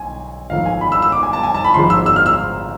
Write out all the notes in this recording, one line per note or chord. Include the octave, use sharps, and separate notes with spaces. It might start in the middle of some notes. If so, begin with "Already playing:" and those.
Already playing: B1 G#5
G#1 G#2 F3 A3 F5
G#5
B5
E6
E6
D6
G#5
A5
G#5
A5
B5
G#1 G#2 F3 G#3 C6
E6
E6
F6
E6